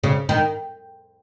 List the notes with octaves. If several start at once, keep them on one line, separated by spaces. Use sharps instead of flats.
C#3
D#3